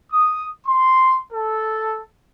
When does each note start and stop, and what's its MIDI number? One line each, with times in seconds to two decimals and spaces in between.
0.12 0.47 87
0.67 1.19 84
1.33 2.03 69